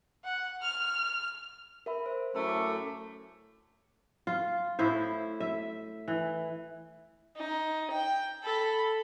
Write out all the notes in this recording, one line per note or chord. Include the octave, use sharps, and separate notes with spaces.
F#5
F6
A#4 E5 B5
C5
F#2 A2 A3
D6
F4
A2 E4 C5
E5
E3
D#4
G5
A4 B5